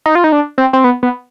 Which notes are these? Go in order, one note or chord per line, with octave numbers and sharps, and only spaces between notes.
D#4
F4
D#4
D4
C4
C4
B3
B3